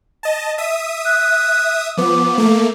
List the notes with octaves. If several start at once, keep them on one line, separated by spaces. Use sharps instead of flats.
D#5 A5
E5 D#6
F#6
F3 B3 D6
A3 A#3